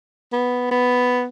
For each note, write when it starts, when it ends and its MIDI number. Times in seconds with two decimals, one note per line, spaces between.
0.33 0.68 59
0.71 1.26 59